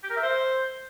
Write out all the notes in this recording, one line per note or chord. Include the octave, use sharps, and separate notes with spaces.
G4
A#4
E5
C5